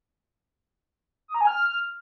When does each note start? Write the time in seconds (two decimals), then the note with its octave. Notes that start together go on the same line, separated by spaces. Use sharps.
1.28 D#6
1.34 A#5
1.41 G#5
1.47 F6